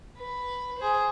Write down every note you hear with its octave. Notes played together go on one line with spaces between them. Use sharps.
B4
G#4 C5